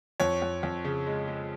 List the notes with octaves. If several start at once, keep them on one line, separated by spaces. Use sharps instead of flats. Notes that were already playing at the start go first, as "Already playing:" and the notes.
F2 C#5
F2
F2
C#3
G#3
G#3